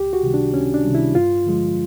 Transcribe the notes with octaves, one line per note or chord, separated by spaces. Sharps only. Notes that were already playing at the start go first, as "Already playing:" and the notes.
Already playing: C#2 G4
F#4
C3 D#3 G3
D4
C#2 C#4
D4
C3 D#3 G3
E4
G2 F4
D3 F3 G#3